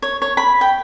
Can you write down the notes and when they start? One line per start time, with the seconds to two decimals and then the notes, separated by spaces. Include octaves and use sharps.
0.02 C#5
0.22 C#5
0.37 B5
0.61 G5